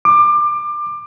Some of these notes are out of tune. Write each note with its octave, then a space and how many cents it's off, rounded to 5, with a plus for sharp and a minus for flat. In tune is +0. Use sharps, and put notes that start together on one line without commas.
D6 +25